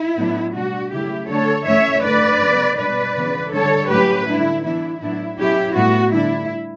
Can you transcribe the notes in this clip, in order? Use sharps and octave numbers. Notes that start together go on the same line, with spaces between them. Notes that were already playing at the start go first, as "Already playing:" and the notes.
Already playing: E4
A2 F#3 B3 D4
B2 G3 D4 F#4
C#3 F#3 A3 E4 G4
D3 F#3 A3 D4 A4 C#5
E3 A3 C#4 C#5 E5
D3 A3 D4 B4 D5
C#3 F#3 B3
B2 G3 D4 B4 D5
C#3 E3 B3
D3 G3 D4 A4 C#5
A2 F#3 C#4 G4 B4
D3 G3 D4 E4
E3 B3 D4 E4
A2 F#3 B3 D4 E4
B2 F#3 C#4 E4 G4
A2 G3 B3 F#4
D3 G3 D4 E4